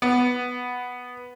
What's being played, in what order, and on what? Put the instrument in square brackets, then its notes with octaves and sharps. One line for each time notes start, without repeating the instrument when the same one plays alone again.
[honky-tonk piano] B3